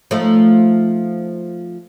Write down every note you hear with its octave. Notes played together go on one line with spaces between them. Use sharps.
F3 A3 D#4